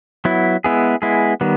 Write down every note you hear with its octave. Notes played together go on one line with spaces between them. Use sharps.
F#3 B3 E4
G#3 B3 E4 G#4
G#3 B3 E4 G#4
D#3 G3 B3